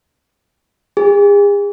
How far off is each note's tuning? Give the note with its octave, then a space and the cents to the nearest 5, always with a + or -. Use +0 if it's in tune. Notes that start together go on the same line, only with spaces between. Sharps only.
G#4 -40